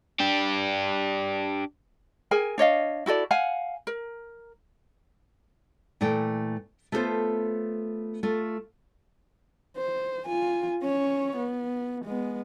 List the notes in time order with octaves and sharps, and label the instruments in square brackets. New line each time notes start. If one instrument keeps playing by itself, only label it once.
[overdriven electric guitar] D4 G4
[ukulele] G#4 A#4 G#5
D4 C#5 D#5 F5
E4 F#4 A4 D5
F5 F#5 G#5
A#4
[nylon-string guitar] A#2 E3 A3 G5
A3 B3 F4 F#4 A4 C5
A3 F4
[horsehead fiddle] C5
F4 G#5
C#4 C#5
B3
G#3 B3